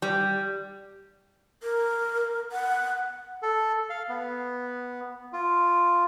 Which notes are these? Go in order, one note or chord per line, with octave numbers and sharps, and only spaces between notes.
G3
A#4
F#5
A4
F5
B3
F4